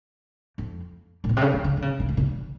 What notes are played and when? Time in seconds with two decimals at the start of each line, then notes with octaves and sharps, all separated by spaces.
0.58 F2
1.24 A#2
1.29 B2
1.37 C3
1.41 C#3
1.53 D#3
1.64 D3
1.77 D3
1.82 C#3
2.00 C3
2.09 A#2
2.17 C3
2.26 D3